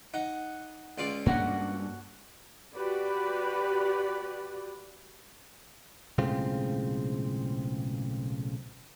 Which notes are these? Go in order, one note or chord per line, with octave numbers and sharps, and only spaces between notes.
D#4 F#5
C#2 F4 D5
G2 A#3 C#4 D4 F#4 F#5
F#4 G4 B4 D5
B1 A2 C#3 G#3 C4 F4